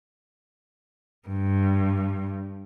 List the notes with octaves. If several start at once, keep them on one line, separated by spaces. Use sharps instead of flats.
G2